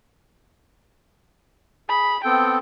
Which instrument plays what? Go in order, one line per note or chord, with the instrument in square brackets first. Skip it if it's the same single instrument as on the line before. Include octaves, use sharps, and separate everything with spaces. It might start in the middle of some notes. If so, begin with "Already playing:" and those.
[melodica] G#4 [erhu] B5
[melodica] B3 C4 A4 [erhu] G5